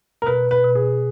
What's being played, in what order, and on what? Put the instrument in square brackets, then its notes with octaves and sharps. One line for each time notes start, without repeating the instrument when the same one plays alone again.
[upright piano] A#4
[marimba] B2 [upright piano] B4
[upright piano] B4
[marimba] B2
[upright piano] G#4